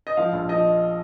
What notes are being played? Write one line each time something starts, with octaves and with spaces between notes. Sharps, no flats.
D#5
F3 F5
A#1
F3 D#5